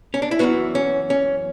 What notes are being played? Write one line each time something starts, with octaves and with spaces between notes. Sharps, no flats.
C#4
D4
E4
F#2 E3 B3 F#4
C#4
C#4